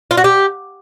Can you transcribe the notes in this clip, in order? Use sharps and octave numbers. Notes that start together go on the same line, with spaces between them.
F4
F#4
G4